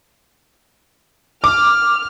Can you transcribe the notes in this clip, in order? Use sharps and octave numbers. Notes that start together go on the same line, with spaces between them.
D6 F6